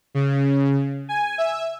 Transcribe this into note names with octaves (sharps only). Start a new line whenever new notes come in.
C#3
G#5
E5